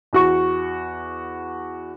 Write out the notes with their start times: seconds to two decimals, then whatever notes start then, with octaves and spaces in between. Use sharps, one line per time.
0.13 E2 F#4 C#6